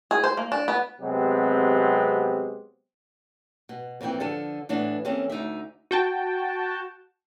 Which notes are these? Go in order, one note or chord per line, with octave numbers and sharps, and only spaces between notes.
G#4
C5
A#3
D4
B3
C3 F#3 G#3 B3 C4 G4
B2
F2 A#2 E3 G5
D3 F3 A4
A2 E3 B3 D4
E3 A#3 C4 C#4 A4
D2 D#4 D5 E5
F#4 G5 A5